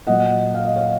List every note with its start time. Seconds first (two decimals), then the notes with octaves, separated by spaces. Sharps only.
0.07 A#2 F#3 D#5 F#5
0.54 F5
0.65 D#5
0.76 C#5 F5